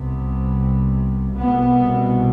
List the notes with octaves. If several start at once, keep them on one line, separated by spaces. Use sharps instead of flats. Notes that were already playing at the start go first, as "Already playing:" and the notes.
Already playing: C2 C3 B3
C2 B2 B3